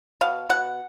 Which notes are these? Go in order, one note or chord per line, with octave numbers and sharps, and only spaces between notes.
B2 F5
B2 F#5